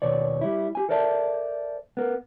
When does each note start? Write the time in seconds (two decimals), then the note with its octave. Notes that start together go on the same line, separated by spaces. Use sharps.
0.02 D#2 B2 C#5 D5
0.41 G3 E4
0.75 G4 G#5
0.89 A4 A#4 C5 D5 E5 A5
1.97 B3 A#4